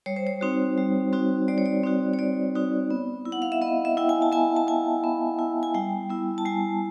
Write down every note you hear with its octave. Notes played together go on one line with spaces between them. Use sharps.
G3 C#5
C5
C#5
C4 D#4 F#4
G3
C4 D#4 F#4
G3 D5
C#5
D5
C4 D#4 F#4
C#5
G3 D5
C4 D#4 F#4
B3
E4
F#5
F5
E5
B3 D#5
E5
E4 G5
G#5
A5
B3 G#5
A5
E4 G#5
B3
E4
G#5
G3 G5
B3 E4
A5
G3 G#5